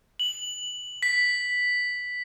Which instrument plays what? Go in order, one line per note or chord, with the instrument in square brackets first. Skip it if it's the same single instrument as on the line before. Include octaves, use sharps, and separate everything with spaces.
[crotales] F#7
B6